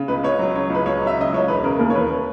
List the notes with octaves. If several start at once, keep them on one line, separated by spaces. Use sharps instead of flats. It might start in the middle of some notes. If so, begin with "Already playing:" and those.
Already playing: C#3
C#2 B4
C#2 C#5
F#3
C#3 C#5
C#2 B4
C#2 C#5
F#3
E5
C#3 D#5
C#2 C#5
E1 B4
C#3 A#4
D#2 A#4
C#5
E1 B4